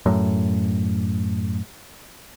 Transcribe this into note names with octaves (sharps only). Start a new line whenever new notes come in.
F#2 A2